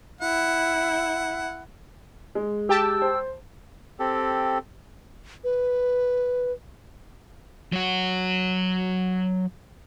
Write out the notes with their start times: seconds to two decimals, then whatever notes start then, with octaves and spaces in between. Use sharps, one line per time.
0.21 E4 F#5
2.35 G#3
2.69 G4 G5 A5 E6
3.02 C5
3.99 C4 G4 A4
5.44 B4
7.72 F#3 F#4